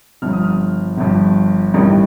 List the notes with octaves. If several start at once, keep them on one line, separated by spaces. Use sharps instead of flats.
G1 G2 F3 F6
D#6
F6
G1 G2 F3
A1 G2 D#3 G3